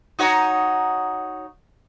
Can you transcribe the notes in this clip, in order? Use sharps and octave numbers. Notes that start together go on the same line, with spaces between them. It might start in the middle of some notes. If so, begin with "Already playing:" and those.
D#4 F#4 C#5